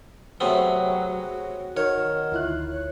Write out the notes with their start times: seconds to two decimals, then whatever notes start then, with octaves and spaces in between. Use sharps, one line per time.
0.40 C3 F#3 A3 B3 F#4 G#4 C#5 G5
1.77 D#3 C#5 F#5
2.31 D2 E4 F4 F#6
2.71 C#5